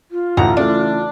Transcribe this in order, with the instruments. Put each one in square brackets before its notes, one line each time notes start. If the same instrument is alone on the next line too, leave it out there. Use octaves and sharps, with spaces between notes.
[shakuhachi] F4
[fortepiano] A1 D2 F#5 [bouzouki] A#5
[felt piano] C#3 E3 A3 [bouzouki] D4 [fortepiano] D5